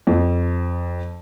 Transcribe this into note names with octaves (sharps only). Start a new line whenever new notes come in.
F2